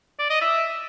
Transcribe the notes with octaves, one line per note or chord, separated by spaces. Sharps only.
D5
D#5
E5